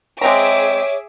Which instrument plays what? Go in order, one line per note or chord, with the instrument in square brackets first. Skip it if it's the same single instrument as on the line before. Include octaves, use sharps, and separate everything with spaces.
[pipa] G#3 C4 A#5 [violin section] G#4 E5 D6 [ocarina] C#5